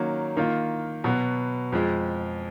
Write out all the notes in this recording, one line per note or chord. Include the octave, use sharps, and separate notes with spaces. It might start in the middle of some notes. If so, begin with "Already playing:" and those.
Already playing: D#3 F#3 A#3 C#4
D#3 A#3 F4
B2 F#3 B3
F2 F3 G#3